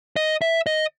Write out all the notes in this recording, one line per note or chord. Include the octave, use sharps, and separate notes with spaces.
D#5
E5
D#5